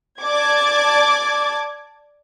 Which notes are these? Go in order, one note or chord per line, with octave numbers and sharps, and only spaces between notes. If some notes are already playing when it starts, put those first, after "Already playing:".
D5 A5 D6 G#6